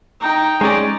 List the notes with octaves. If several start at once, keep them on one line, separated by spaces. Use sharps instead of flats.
D#4 G5
G#3 C#4 D#4 D5